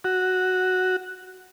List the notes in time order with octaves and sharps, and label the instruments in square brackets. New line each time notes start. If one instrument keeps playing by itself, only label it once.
[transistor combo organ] F#4